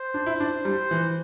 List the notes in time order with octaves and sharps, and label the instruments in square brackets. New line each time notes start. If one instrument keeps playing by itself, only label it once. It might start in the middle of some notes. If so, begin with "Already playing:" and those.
Already playing: [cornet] C5
[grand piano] D4
E4
D4
G3
E3